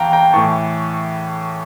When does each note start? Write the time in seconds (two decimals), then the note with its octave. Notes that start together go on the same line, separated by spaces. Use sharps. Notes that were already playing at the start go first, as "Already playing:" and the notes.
Already playing: E2 E3 F5 G5 A5 A#5
0.13 G5 A#5
0.33 A2 E3 A5 C#6